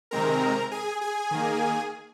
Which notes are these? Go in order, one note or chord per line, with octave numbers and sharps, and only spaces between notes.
C3 D#3 G#3 C4 A#4 A#5
G#4 G#5
G#4 G#5
D#3 A#3